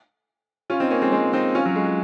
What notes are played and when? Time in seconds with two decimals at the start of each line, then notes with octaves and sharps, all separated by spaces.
0.70 C#4 F4
0.80 C4 D#4
0.90 A#3 C#4
1.01 G#3 C4
1.12 G#3 C4
1.33 C4 D#4
1.55 C#4 F4
1.65 F#3
1.76 G#3
1.86 G#3